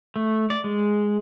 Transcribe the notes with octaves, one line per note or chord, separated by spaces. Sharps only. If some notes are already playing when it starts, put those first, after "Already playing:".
A3
D5
G#3